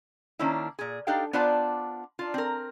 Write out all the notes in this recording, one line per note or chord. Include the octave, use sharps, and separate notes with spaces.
D#3 A#3 C#4 D4 E4
A#2 G#4
D4 D#4 G4 A4 F5 G5
B3 D4 F4 C5 D5 A5
D4 F4
C4 A#4